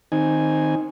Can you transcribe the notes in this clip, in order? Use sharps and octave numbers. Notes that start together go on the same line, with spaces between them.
D#3 C4 D#4 G#5